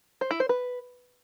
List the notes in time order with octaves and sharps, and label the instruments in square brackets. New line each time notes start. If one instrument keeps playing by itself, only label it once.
[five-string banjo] C5
E4
C5
B4